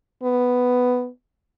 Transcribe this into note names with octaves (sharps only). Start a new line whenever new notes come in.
B3